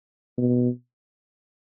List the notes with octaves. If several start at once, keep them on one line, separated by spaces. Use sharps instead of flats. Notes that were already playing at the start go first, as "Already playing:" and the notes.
B2